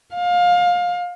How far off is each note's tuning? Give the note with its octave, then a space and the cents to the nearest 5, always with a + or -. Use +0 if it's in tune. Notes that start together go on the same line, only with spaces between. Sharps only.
F5 +25